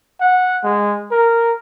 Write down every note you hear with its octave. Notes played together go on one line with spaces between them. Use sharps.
F#5
G#3
A#4